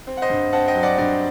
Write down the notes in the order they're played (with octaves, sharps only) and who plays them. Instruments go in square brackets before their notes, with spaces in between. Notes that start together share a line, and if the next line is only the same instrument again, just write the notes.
[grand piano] C4
F#5
C5 D#5
G2
C4 F#5 A5
D#5 G5
F#3
D5 F#5
G2 D5